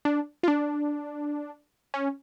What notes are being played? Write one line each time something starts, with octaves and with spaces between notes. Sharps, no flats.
D4
F4
D4
C#4